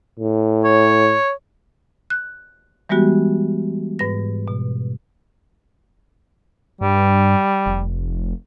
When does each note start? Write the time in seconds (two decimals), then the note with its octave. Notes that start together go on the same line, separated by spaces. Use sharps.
0.19 A2
0.64 C#5
2.10 F#6
2.89 E3 G3 G#3 B3 F#4 G4
3.99 G#2 B4 A#6
4.48 B2
6.81 G2 G3
7.66 F1